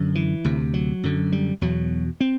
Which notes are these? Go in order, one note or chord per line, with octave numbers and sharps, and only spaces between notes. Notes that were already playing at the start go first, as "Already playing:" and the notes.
Already playing: F#2 D3
E3
D2 C3
F#3
F#2 D3
G3
E2 B2 F#3
C4